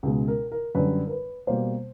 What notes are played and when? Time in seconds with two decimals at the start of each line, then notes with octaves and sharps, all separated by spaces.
0.03 C#2 B2 G#3
0.28 A#4
0.52 A#4
0.75 F#2 D3 G3 B4
1.07 A#4
1.11 B4
1.47 B2 G3 A#3 C5